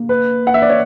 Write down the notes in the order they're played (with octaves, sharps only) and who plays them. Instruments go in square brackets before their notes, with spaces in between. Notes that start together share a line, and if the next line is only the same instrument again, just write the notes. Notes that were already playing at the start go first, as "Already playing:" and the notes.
Already playing: [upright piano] A#3
[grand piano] B4
F#5
E5
D5
C#5